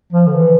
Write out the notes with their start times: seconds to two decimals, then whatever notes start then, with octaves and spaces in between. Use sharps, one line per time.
0.13 F3
0.27 D3
0.34 E3